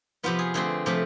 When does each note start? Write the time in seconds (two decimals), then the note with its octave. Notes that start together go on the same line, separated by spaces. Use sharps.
0.23 C3 F3 B3 F4
0.39 G#4
0.54 D3 A3 C4 G#4
0.86 C3 F3 A3 C4